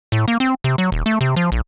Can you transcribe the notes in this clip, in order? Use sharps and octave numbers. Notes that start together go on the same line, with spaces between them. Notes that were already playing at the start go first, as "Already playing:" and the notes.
A2
A#3
C4
C3
F#3
D#1
A3
C3
F3
A#1